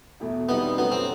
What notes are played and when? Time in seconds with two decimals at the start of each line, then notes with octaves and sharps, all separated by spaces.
0.20 E2 B2 A3 E4
0.48 B2 G3 B3 C4 D#4
0.77 F#2 F#3 A3 B3
0.92 C4